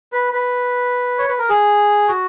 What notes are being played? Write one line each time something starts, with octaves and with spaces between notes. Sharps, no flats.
B4
B4
C#5
B4
A#4
G#4
F#4